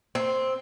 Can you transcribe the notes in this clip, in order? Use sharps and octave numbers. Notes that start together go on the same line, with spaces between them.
C4